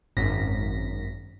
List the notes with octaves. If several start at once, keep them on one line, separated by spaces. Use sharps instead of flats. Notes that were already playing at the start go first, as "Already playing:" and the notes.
G#1 F#2 A#6 B6